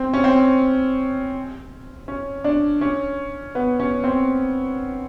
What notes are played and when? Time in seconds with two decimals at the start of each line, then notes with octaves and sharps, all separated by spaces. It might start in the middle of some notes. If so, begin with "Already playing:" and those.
Already playing: C4
0.14 C#4
0.24 C4
2.08 C#4
2.44 D4
2.81 C#4
3.55 B3
3.80 C#4
4.04 C4